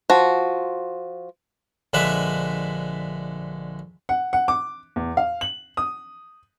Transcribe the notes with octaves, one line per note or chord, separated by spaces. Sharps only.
F3 F#4
A#1 D3 G#3 B4 E5 B5
F#5
F#5
D6
E2
F5
F#7
D#6